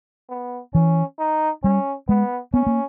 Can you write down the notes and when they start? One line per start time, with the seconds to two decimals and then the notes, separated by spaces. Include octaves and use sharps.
0.29 B3
0.74 E3 C#4
1.19 D#4
1.63 G3 C#4
2.08 G#3 B3
2.53 B3 C#4
2.67 A#3